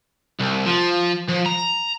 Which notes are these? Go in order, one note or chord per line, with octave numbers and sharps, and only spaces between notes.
C2
F3
F3
A#5